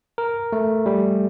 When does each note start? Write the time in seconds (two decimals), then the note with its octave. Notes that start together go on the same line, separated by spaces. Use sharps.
0.18 A#4
0.53 A3
0.86 G3